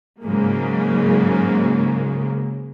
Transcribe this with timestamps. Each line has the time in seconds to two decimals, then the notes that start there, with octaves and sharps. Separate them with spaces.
0.22 G#2 C#3 F#3 G#3 A#3